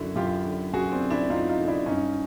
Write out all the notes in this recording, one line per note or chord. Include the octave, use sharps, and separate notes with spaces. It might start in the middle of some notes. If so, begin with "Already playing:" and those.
Already playing: F#2 D3 E4 F#4
F#2 F4 G4
D3
F#2 F#4 G#4
C4 D4
D3
D4 E4
F#2 D#4 F4
D#4 F4
D3
D4 E4
G2 C#4 D#4